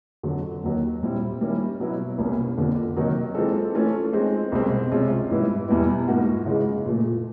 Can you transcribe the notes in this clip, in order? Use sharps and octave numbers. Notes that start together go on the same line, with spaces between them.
F2 D3 F#3
D#2 D#3 F#3 A#3
A#2 G3 C4 E4
D#3 G3 A#3 C#4 E4
B2 F#3 B3 E4
C2 B2 G3 A#3 C#4
F2 D3 F3 A#3 D4
C3 D#3 F#3 A#3 D#4
E3 G#3 C4 F4 A4
E3 A3 C#4 F4 A4
F3 G#3 C4 D#4
C2 B2 G#3 C4
C3 F3 G#3 C#4 F4
G#2 E3 G3 B3 E4
E2 B2 G3 B3 E4
G#2 F3 A#3 D#4 F#4
C#3 E3 G#3
A#2 F3 A3